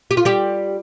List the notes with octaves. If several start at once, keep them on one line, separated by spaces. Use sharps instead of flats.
G4
F4
G3 G4